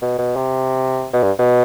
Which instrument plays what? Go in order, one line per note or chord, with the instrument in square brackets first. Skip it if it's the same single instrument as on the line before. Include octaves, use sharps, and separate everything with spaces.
[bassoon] B2
B2
C3
B2
G2
B2